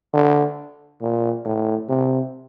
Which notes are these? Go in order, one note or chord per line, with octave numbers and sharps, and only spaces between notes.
D3
A#2
A2
C3